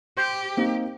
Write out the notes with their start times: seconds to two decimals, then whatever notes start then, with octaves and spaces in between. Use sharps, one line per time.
0.17 G4 C5
0.57 A#3 C4 D#4